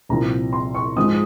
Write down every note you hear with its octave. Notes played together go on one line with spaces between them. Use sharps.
C2 A#2 F3 A#5
C6
C#6
G#2 F3 G#3 D#6